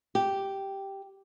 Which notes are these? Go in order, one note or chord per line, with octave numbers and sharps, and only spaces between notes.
G4